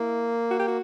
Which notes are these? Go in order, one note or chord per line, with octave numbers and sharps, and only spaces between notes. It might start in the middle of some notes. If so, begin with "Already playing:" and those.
Already playing: A#3 E4
F#4
G4
F#4